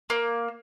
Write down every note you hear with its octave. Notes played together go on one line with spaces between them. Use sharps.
A#3